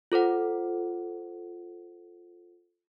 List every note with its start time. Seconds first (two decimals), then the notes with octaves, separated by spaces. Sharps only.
0.12 F4 A4 C5 F#5